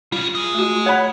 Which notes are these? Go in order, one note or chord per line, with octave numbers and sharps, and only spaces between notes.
G3 C#4 F4
G#4 D#5
A3 F#4
C#5 F#5 B5